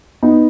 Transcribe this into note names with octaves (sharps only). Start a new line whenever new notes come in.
B3 D#4